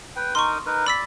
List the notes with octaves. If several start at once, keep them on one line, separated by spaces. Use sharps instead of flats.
B4 G5
D#4 A#4 C6 C#6 D#6
D#4 A#4 B4
D5 B5 E6 B6